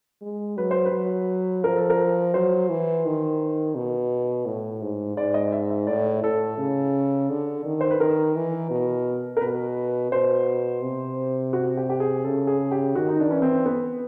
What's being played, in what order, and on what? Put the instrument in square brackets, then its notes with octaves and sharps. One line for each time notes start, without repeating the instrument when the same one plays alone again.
[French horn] G#3
[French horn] F#3 [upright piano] B4
[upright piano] C5
B4
[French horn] F#3
[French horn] F3 [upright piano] A#4
[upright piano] A4
A#4
[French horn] F#3 [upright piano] C5
[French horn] E3
D#3
B2
A2
G#2
[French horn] G#2 [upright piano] D5
[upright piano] D#5
E5
E5
[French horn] A2 [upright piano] D5
[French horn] A2 [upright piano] A4
[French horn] C#3
D3
D#3
[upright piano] C5
B4
[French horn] D#3 [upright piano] A#4
[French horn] E3
B2
[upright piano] A#4
[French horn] B2 [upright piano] B4
[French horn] B2 [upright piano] C5
[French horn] C3
[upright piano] F#4
G4
G4
G#4
[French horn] C#3 [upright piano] A4
[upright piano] G#4
G4
[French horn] D#3 [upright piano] F#4
[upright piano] D#4
D4
[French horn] E3 [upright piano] C#4
[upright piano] C4
B3